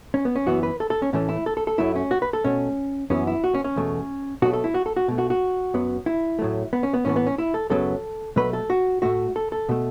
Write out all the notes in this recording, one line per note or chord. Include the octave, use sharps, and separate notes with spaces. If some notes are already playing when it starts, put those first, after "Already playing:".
C#4
B3
C#4
F#2 E3 B3 F#4
B4
A4
A4
C#4
A2 E3 A3 C#4
E4
A4
A4
A4
F#2 F#3 A3 E4
C#4
F#4
B4
A4
B2 A3 C#4
F#2 E3 B3 C#4
E4
F#4
C#4
C#4
E2 B2 A3
B2 F#3 A3 F#4
A4
E4
F#4
A4
F#4
B2 A3
F#4
F#4
F#2 F#3 B3
E4
A2 F#3 A3
B3
C#4
B3
A2 E3 B3 C#4
B3
C#4
E4
A4
F#2 C#3 F#3 B3 A4
B2 F#3 A3 B4
A4
F#4
A2 A3 F#4
A4
A4
B2 A3